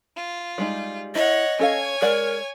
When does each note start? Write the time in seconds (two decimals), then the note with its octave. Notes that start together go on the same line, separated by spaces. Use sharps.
0.17 F4
0.58 G3 G#3 D#4
1.15 E4 C#5 D#5 F#5
1.59 C#4 A4 C#5 F5 G#5
2.02 G#3 A#4 D5 F#5